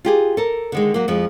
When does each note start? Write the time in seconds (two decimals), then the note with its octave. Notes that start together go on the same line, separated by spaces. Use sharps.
0.05 F4 G4 G#4
0.37 A4 A#4
0.72 D3 D#3 G#3
0.94 F#3 A#3
1.08 F2 F3 G#3